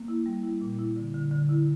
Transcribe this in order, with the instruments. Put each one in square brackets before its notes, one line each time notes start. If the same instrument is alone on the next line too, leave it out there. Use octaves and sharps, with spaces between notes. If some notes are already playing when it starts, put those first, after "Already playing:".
Already playing: [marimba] A#3
E4
G3
E4
A#2
E4
D3
D3
D3
E4